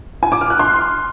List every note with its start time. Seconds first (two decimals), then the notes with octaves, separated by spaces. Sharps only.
0.23 G#5
0.32 D6
0.41 F6
0.50 F#6
0.59 C6